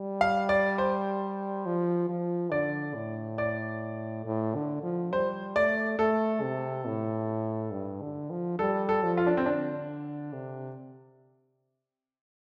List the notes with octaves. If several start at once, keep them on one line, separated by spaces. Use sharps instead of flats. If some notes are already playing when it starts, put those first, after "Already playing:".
Already playing: G3
F5
D5
C5
F3
F3
D3 D5
A2
D5
A2
D3
F3
G3 C5
A3 D5
A3 A4
C3
A2
G2
D3
F3
G3 A4
A4
F3
F4
D4
C4
D3 D4
C3